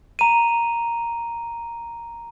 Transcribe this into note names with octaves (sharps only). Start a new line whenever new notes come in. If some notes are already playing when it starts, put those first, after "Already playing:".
A#5 D#7